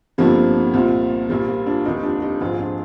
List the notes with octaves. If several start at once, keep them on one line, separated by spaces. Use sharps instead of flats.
G1 F2 D3 F3 G3 A#3
C2 A#2 F3
A#1 A#2 F3 G3 A#3
G3 A#3
D4 F4
F1 D#2 D#3 D#4 G4
D4 F4
D#4 G4
A#1 G#2 F3 F4 G#4
D4 F4